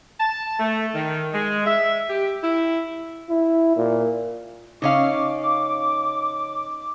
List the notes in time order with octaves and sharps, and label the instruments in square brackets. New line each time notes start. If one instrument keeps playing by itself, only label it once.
[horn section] A5
A3
D#3
G#3
E5
G4
E4
[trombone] E4
A#2
[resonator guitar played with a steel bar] C#3 C#4 F5 [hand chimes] D#4 D#5 [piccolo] D6